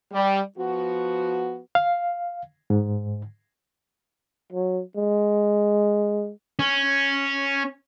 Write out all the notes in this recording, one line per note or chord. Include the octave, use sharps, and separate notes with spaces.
G3
F3 B3 F#4
F5
G#2
F#3
G#3
C#4